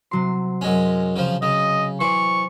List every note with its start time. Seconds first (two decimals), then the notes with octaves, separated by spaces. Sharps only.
0.11 C3 F#3 C6
0.61 F#2 G#3 C#4
1.16 C#3 F3
1.42 C#3 D#5
2.01 E3 C5 D5 C#6